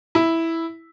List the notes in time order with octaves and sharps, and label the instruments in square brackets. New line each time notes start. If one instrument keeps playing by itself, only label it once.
[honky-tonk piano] E4